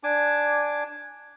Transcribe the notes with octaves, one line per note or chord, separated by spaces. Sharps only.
D4 G#5 D6